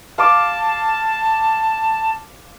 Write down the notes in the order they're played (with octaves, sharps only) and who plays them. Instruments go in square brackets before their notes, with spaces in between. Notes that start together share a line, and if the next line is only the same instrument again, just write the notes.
[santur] F5 D6 [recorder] A5